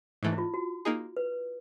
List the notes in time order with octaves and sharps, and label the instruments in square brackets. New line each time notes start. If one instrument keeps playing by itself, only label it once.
[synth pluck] G#2 E3 A3
[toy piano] E4
F4
F#4
[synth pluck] A#3 D#4 G#4
[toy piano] B4